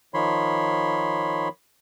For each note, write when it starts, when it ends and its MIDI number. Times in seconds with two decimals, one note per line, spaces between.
0.14 1.48 51
0.14 1.48 53
0.14 1.48 73
0.14 1.48 83
0.14 1.48 84